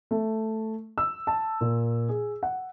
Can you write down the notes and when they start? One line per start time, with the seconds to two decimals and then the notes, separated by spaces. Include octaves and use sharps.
0.11 A3
0.98 E6
1.27 A5
1.61 A#2
2.09 G#4
2.43 F#5